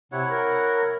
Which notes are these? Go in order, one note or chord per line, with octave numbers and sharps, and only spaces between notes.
C3 E4 C#5 F#5
A#4